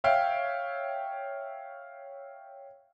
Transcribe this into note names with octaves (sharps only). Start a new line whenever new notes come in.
C#5 E5 F5 G5